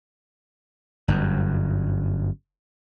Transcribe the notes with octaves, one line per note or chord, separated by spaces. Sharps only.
G1 F#2